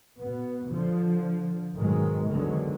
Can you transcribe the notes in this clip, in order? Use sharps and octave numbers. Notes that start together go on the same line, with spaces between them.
B2 B3
D3 F3
G#2 B2 D#3 F#3 G#3
E2 D3 D#3 F#3 G#3